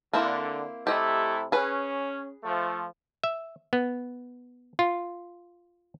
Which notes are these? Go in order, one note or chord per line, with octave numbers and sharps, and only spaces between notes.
D3 A#3 C4 E4
C3 A3 E4 G4 D#5
C#4 G#4 B4
F3 A3
E5
B3
F4